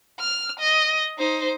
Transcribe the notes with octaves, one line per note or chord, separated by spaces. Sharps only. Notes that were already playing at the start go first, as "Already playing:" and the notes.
F6
D#5
D#4 C5